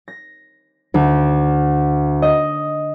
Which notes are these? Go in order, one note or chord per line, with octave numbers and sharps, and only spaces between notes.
A#6
D2
D#5